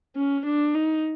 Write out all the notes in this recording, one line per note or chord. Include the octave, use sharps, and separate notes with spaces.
C#4
D4
D#4